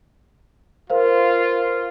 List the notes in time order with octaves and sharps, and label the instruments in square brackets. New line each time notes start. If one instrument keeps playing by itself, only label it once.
[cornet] F4 [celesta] A#4 C5 F5